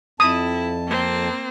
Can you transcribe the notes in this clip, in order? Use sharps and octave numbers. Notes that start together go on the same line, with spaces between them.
F2 E4 A5 D#6
A#3 C4